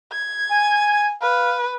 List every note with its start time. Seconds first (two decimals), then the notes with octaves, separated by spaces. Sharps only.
0.12 G#6
0.51 G#5
1.22 B4 F5